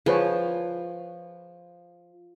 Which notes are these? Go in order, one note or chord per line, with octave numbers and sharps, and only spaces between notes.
F3 G#4 B4 C#5